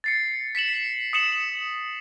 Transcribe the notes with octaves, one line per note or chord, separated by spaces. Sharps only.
A6 C7 C#7
B6 C#7 E7 F#7
D#6 C#7 E7 F#7